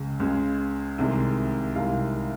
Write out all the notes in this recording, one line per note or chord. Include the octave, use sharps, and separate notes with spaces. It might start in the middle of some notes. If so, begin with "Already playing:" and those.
Already playing: C#2 C#3 G#3
C#2 C#3 G#3
C2 C3 D#3 G#3
C2 C3 D#3 G#3 F5